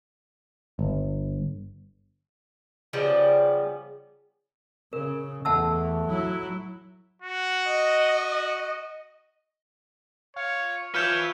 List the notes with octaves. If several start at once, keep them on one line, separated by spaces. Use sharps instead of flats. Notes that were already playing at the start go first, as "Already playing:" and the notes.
G1
C#3 F3 G3 B3
C#3 A#4
E2 A3 F#5 A5 E6
F#3 E4
F#4
D#5
F4 C#5
F3 B4 C#5 E5 F6 G6